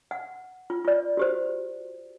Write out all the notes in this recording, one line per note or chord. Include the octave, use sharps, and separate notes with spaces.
F#5
F4
F4 D5
F#4 G4 C5